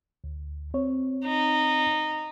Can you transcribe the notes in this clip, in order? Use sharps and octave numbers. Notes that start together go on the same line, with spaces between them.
D2
C4 C#5
D#4